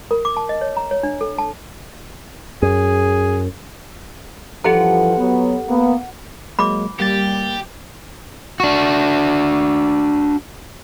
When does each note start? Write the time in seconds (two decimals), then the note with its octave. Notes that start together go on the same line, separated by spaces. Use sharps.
0.11 A#4
0.25 D6
0.37 A5
0.49 D#5
0.61 C#5
0.77 A#5
0.91 C#5
1.03 D4
1.21 A4
1.38 A5
2.62 F#2 G#4
4.64 G2 E3 F3 G4 A4 F#5 A#5
5.18 F#3 B3
5.68 A#3 B3
6.59 F#3 G#3 A#3 B5 D6
6.99 G3 A#3 G4 A6
8.60 D4 F#4